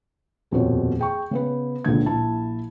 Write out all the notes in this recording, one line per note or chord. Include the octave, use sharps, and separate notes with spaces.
D#1 F2 B2 C4 C#5
G#4 G5 C#6
C#3 B3 B4
C#2 A#2 D3 G#6
A#1 E4 A5